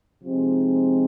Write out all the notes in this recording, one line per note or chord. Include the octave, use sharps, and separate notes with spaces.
C3 F3 G#3 C4 D#4